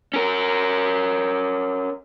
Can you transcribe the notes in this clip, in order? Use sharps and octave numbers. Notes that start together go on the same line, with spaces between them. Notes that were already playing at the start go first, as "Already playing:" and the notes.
C#4 A#4